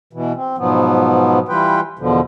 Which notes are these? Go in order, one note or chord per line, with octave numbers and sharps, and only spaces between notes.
B2 E3
C4
G#2 B2 F3 F#3 B3
E3 G3 F4 B4 G5
E2 B2 D3 F3